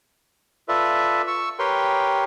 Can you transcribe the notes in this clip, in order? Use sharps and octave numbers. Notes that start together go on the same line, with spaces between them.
F4 A4 B4 D5 E5
C#6 E6
G4 A#4 B4 C#5 G5 C6